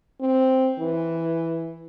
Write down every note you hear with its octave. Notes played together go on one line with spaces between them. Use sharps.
C4
E3